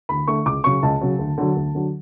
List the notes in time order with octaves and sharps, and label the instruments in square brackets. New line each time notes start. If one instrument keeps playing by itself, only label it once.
[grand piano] D2 B5
D3 A3 C#6
C#2 D6
C#3 F#3 C#6
C#2 A5
C#3 F#3
D2
D3 F#3
D2
D3 F#3